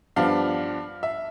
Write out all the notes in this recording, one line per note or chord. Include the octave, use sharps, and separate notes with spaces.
G2 F3 B3 D4 F5
E5